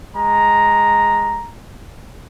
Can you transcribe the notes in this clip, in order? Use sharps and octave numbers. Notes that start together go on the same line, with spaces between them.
G#3 A#5